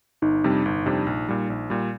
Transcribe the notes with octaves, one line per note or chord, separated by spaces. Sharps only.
G1 D#4
F2 C3 G3 D4
G1
F2 C3 G3 D4
A#1
A#2 G3
A#1
A#2 G3